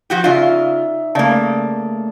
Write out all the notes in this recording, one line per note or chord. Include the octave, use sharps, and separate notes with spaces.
F3 F#4 G4
C#3 D#4 F4 D5 E5
C#3 A3 A#3 D5 A5